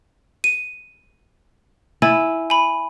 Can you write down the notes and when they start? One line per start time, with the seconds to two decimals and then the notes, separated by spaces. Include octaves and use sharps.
0.44 D#7
2.02 E4 G#5
2.50 G#5 B5